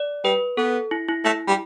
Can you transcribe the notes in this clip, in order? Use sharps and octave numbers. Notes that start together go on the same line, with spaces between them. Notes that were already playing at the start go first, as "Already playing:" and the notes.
Already playing: D5
G3 B4
B3 A4
E4
E4
A3 E4
G3